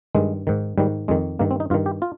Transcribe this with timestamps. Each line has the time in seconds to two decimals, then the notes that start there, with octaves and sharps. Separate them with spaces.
0.15 G2 D#3 G#3
0.47 G#2 D#3
0.78 G#2 D#3 G3
1.08 F2 D#3 G#3
1.39 G2 D#3 A#3
1.51 C4
1.60 D#4
1.70 G2 F4
1.74 D#3
1.86 G4
2.02 F4